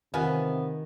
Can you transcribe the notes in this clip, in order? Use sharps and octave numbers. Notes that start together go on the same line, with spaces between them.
C3 D#3 B3 F4 G#5